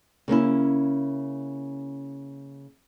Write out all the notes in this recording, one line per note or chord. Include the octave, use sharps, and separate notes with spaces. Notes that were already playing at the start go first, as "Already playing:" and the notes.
C#3 A#3 C#4 E4